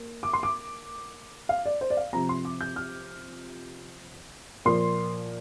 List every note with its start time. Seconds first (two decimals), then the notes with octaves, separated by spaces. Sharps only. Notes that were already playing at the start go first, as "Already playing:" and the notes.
Already playing: A#3
0.23 D6
0.33 C6
0.43 D6
1.49 F5
1.66 D5
1.81 C5
1.90 D5
1.97 F5
2.13 C3 F3 C4 A#5
2.29 C6
2.45 D6
2.61 G6
2.76 F6
4.65 A#2 F3 A#3 C6